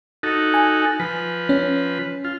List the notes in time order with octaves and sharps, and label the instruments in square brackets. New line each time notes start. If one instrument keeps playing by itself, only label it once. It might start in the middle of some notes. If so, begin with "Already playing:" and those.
[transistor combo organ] D#4 F#4 A4
[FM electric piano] G#5
[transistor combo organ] F3 B4
[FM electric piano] C#4
[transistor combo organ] F4